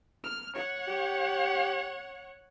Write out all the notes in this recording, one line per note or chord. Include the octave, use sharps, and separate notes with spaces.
F6
C#5 F#5
G4